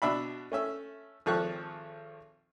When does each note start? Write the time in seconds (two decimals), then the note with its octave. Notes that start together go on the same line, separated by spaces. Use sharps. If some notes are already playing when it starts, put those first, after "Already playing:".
0.02 B2 D4 E5 B5
0.52 A3 C#4 E5
1.26 G#1 F3 A4 C#6 F#6